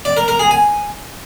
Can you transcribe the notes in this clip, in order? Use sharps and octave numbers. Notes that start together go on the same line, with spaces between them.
D5
A#4
A#4
G#4
G#5